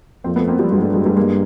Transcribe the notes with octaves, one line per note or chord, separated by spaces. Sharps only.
F2 A#3 C4
A3 B3
A#3 C4
F3 G3
G2 F#3 G#3
G3 A3
F#3 G#3
G3 A3
G#3 A#3